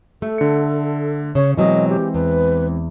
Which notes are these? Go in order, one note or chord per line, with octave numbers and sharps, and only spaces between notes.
A3 A4
D3 C#7
C#3 C#5
B2 E3 F#3 G#3 C4 D#5
G4
E2 B4